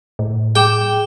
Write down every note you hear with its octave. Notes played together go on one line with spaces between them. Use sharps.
A2
G#4 G5 D6 E7